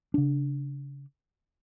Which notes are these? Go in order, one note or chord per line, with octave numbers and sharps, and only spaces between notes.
C#3 D4